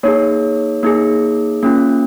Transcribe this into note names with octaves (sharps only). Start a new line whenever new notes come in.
A#3 D#4 G#4 C#5
A#3 D#4 G#4
A#3 C#4 F4